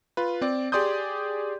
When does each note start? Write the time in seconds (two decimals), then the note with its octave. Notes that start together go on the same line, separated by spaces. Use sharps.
0.17 F4 B4
0.41 C4 D5
0.72 G4 G#4 D5 C6 D#6 G6